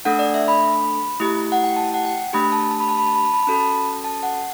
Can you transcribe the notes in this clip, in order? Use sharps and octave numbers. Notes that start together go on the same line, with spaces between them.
A3 D4 A4 F#5
D5
E5
B5
A3 E4 G4
F#5
G5
A5
F#5
G5
A3 D4 G4 B5
A5
A5
B5
A5
B5
A5
B5
A5
B5
A5
C#4 F#4 A4 B5
A5
A5
F#5